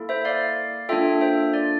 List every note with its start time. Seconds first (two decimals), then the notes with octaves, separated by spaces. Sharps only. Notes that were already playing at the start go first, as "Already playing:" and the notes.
Already playing: A#3 E4 A4
0.09 C5 E5
0.25 D5 F5
0.89 A#3 D4 F4 A4 E5 G5
1.21 C5 E5
1.53 D5